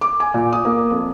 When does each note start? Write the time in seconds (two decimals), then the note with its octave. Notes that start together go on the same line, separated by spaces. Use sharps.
0.01 D6
0.20 G#5
0.34 A#2
0.53 D#6
0.65 A#3
0.91 F2